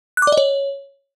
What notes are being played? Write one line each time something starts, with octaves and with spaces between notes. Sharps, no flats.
F#6
D6
D5
D#5
C#5